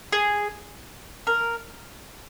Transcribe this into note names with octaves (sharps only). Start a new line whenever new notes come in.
G#4
A#4